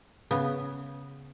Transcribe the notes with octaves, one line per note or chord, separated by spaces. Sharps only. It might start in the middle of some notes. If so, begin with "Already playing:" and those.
C#3 B3